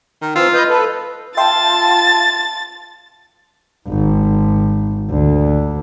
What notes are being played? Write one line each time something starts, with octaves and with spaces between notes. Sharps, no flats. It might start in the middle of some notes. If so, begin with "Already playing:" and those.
D#3
E3 C4 F4 E6
B4 D#5 G6
A4 B4
F4 E5 G5 A5 C6 A6
G#1
D2